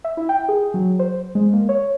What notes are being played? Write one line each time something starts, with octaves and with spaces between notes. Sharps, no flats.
E5
E4
G5
G#4
F#3
C5
G#3
A#3
C#5